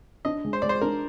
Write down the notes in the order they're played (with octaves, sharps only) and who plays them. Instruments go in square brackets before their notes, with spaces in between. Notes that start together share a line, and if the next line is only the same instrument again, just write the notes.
[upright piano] D4 [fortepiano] D#5
[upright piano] G#3
[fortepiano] C5
[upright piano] G#3 [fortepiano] D5
[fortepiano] C5
[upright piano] D4 [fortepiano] A#4